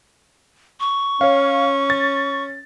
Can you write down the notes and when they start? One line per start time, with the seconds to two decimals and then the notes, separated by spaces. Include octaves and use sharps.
0.80 C#6
1.21 C#4 C#5 F5
1.90 A6